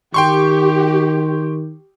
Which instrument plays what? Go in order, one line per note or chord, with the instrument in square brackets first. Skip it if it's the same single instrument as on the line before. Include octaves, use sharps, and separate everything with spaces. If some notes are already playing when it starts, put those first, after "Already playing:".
[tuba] D#3 [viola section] G4 [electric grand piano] G5 C6 C#6